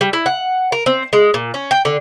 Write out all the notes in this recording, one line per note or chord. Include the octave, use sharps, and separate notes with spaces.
G3
E4
F#5
A#4
C4
G#3
A#2
C#4
G5
D3